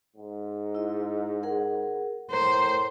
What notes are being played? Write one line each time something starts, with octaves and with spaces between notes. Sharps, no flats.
G#2
E4 D#5
G#4 A#4 F#5
A2 A#4 C5 A#5